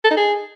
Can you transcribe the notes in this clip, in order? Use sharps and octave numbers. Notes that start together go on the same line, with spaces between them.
A4
D#4
G#4